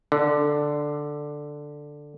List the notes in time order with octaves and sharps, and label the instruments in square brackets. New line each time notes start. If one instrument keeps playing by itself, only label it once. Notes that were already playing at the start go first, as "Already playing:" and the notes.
[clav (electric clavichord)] D3